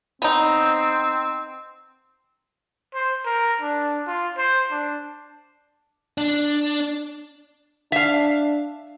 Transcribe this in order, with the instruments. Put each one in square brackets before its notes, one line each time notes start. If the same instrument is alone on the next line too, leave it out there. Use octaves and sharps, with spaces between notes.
[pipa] B3 D#4 [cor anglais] C4
[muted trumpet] C5
A#4
D4
F4
C5
D4
[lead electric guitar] D4
[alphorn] D4 [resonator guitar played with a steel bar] E5 F5